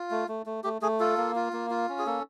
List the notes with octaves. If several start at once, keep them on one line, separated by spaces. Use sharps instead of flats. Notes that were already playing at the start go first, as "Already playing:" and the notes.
Already playing: F4
A3
A3
A3
A3 G4
A3 G#4
F4 A4
A#3
F4
A#3
F4
C#4
G#4
A#3 A4